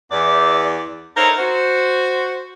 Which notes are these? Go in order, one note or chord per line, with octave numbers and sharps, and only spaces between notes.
E2 D5
D#4 E4 A4 A#4 C5 C#5
F#4 C5